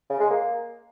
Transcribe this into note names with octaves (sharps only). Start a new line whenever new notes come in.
C#3
G#3
A#3